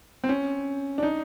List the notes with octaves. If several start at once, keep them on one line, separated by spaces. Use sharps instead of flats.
C4
C#4
D4
D#4